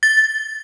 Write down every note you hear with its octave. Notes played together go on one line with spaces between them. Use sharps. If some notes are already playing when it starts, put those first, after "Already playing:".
A6